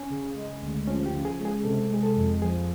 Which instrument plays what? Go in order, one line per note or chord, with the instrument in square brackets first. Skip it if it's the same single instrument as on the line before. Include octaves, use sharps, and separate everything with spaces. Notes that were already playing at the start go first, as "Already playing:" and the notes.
Already playing: [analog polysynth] C#4
C#3
G#3
D2
[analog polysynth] F3 [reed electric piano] C#4
[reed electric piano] G4
[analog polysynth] C#3
[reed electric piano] G#4
[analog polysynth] G#3
[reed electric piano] G#4
[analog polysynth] C3 [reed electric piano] A4
[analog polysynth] G#3 [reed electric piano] G#4
[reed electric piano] A4
[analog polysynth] F2
[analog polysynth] F3 [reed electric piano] G#4